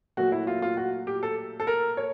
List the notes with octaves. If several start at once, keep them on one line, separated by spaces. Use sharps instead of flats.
A#2 F#3 A3 F#4
E4
F4
F4
F#4
G4
A4
A4
A#4
C#5